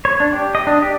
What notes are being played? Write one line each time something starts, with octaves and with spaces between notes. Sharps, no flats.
C#5
D4
G4
D#5
D4
G4